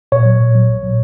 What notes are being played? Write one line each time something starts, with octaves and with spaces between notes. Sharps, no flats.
A#2 C#5
F#3
A#2
F#3
A#1
A#2